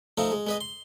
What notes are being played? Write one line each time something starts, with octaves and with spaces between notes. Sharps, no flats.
F3 A3 D#4 F5
G#3
G#3 B4 D#5
C6